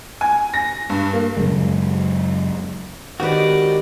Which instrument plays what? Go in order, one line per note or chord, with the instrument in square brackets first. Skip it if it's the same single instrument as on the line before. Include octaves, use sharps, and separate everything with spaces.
[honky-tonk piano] G#5
A#6
G2
A#3
[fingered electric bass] F#2 C#3 F#3 G#3
[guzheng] D#3 B4 [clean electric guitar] G#3 C4 F#4 [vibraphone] G4 [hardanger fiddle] D5 D#5